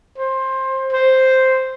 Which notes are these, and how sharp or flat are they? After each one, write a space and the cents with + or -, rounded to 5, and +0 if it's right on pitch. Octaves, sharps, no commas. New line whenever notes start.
C5 +20
C5 +0